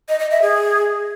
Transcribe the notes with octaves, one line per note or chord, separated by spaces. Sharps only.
D#5
D#5
E5
G#4